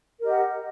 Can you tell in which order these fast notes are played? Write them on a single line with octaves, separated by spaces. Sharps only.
A#4 G4 D#5 F#5